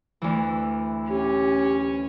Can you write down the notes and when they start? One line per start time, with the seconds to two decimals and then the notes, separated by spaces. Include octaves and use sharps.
0.22 D2 E3
1.09 C#4 G4